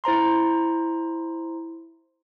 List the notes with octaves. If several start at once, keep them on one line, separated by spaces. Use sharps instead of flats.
E4 C5 A#5 C6